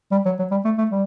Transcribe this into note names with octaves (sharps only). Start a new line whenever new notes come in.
G3
F#3
F#3
G3
A3
A3
G3